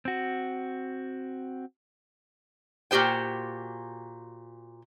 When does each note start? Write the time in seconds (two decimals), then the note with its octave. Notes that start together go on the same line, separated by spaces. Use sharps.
0.05 C4 F#4
2.91 A#2 F#4 G4 C5 G5